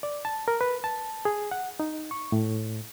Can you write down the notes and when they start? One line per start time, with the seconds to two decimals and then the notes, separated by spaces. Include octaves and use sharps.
0.03 D5
0.25 A5
0.48 A#4
0.61 B4
0.84 A5
1.25 G#4
1.51 F#5
1.80 D#4
2.11 C#6
2.32 A2